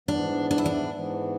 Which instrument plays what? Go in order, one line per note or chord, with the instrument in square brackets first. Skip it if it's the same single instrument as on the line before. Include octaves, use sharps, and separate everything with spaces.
[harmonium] G#2 E3 B3 [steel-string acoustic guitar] D4
[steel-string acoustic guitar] D4
E4
D4
[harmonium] G#2 E3 B3